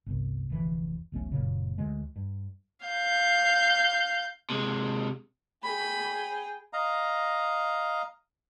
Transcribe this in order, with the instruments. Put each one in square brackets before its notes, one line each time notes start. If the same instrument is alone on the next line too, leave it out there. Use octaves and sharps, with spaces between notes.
[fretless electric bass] G1 C2
F1 D2 E3 F3
E1 B1 A3 C#4
F#1 A#2 C#3
D2 G#3
G2
[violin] F5 G6
[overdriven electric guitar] C3 G#3
[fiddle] G#4 G5 [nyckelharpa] B5
[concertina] D#5 F5 A#5